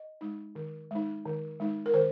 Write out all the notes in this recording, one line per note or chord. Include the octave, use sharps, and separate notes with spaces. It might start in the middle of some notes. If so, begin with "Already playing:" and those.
Already playing: D#5
G#3 D#4
D#3
G#3 D#4
D#3
G#3 D#4
A#4
D#3 C5